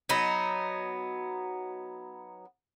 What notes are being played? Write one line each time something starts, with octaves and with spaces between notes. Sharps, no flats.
F#3 B3 D#4